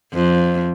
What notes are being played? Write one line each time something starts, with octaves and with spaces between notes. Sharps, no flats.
F2